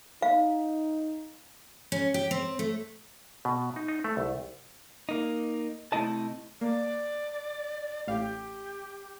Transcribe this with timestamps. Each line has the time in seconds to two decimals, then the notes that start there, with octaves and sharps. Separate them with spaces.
0.22 D#4 F5
1.92 C#4
2.14 G4
2.31 C4
2.59 A3
3.45 B2
3.76 D#4
3.88 D#4
4.04 A3
4.17 C2
5.09 A#3 D#4
5.92 C3 A3 E4 D#5 A5
6.61 A#3 D5
8.07 A1 A2 G4 F5